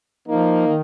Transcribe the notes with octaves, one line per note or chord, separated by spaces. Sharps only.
F3 A#3 D#4
D#3